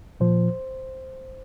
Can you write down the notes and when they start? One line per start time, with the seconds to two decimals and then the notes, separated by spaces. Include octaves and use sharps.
0.20 A#2 F3 C5